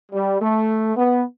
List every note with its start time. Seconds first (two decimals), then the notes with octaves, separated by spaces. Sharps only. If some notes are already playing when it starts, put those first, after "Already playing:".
0.12 G3
0.41 A3
0.96 B3